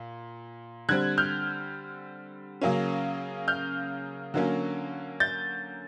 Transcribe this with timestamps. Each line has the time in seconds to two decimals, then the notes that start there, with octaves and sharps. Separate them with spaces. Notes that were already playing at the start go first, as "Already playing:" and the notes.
Already playing: A#2
0.89 D3 G3 C4 F#6 G#6
1.18 F6 G6
2.61 C#3 F#3 A#3 C#4
3.48 F6 G6
4.34 D3 F#3 A#3 C#4
5.20 G6 A6